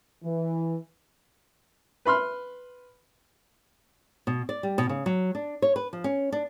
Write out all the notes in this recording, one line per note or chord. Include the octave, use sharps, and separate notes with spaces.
E3
B4 B5 C6 F6
B2
D5
G3
B2
C#3
F#3
D4
C#5
B4
F3
C#4
D4